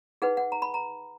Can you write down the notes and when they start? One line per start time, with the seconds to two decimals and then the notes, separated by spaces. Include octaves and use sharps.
0.22 D#4 G#4 B4 F#5
0.37 F#5
0.52 A#5
0.62 B5
0.74 A#5